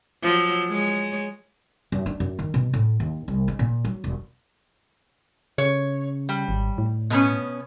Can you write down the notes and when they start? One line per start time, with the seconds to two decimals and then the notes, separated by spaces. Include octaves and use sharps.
0.23 F3 F#3
0.69 G#3 C#5
1.92 F#2
2.06 D4
2.20 F#2
2.39 D#3
2.54 B2
2.74 A2
3.00 D#2
3.28 C2
3.48 G#3
3.59 A#2
3.85 F#3
4.04 E1
5.58 C#3 C#5
6.29 G3
6.49 G#1
6.78 A2
7.10 B2 B3 C#4